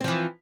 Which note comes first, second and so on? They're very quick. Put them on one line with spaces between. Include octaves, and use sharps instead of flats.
C4 F3 E3